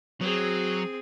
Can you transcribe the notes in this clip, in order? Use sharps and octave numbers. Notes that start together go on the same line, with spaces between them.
F#3 C4 G#4